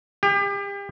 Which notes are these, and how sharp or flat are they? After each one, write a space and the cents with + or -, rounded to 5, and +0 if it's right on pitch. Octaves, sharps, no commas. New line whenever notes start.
G4 +35